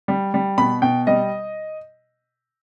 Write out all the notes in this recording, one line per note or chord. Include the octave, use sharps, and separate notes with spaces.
G3
G3
B2 B5
B2 G5
G3 D#5